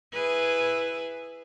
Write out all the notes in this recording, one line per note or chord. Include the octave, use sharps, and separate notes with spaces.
E4 G#4 B4